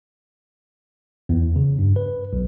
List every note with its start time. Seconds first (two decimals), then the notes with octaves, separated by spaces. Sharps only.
1.29 E2
1.56 C#3
1.79 G2
1.96 B4
2.33 B1